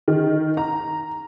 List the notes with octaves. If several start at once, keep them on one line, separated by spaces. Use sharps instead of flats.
D#3
A#5